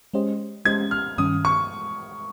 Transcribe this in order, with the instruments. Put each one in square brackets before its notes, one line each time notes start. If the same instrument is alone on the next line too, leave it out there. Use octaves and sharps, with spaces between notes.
[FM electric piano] G#3 C#4 G4 C5 D#5
[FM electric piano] G#3 C#4 G4 C5 D#5 [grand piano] G#6
[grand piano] F6
[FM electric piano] G2 D#3 G3 C#4 [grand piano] D#6
[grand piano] C#6